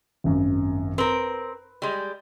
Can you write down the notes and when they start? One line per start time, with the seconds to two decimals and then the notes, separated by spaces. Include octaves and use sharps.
0.24 G#1 F#2
0.98 C4 A#4 B4
1.82 G3 G#3